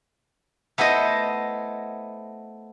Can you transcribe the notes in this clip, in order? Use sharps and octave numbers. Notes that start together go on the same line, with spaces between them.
A3 B3 E4 C5 D#5